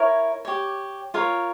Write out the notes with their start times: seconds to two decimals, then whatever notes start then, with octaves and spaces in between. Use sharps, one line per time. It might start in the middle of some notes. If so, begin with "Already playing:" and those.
Already playing: E4 A#4 C#5
0.45 G4 C#5
1.14 F4 A#4 C#5